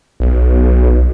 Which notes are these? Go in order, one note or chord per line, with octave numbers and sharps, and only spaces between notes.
B1